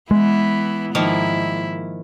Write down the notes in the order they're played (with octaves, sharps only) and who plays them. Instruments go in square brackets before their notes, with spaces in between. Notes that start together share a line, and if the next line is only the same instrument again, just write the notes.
[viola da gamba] E3 B3 E4 [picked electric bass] G#3
[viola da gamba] G#2 E4 [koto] D#3 F3 A#3